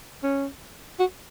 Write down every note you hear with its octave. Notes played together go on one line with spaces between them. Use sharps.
C#4
F#4